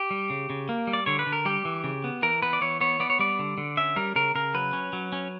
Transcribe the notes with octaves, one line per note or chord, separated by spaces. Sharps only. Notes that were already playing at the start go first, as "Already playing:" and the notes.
Already playing: G4
G3
C#3
C#3
A#3
G3
D5
D3 C#5
B4
D3
A#4
G3 G4
E3
C#3
B3
E3 A#4
B3 B4
D5
E3 C#5
B3 C#5
B3 D5
C#5
G3 D5
D3
D3
C#4 E5
G3 A#4
C#3 A#4
C#3 A#4
F#3 B4
C#4
F#3
C#4